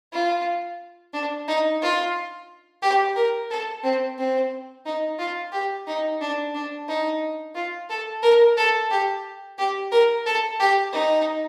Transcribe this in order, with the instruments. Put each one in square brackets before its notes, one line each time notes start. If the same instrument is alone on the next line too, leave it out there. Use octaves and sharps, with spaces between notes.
[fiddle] F4
D4
D#4
F4
G4
A#4
A4
C4
C4
D#4
F4
G4
D#4
D4
D4
D#4
F4
A4
A#4
A4
G4
G4
A#4
A4
G4
D#4